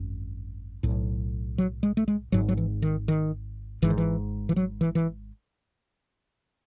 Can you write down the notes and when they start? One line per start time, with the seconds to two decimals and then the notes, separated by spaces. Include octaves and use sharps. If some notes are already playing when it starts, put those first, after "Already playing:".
Already playing: G#1 F#2
0.83 B1 A2
1.58 F#3
1.83 G#3
1.97 A3
2.08 G#3
2.32 G#1 G#2 F#3
2.49 F#3
2.57 E3
2.82 D#3
3.08 D#3
3.82 G#1 G#2 E3
3.90 D#3
3.98 E3
4.49 E3
4.56 F#3
4.81 E3
4.95 E3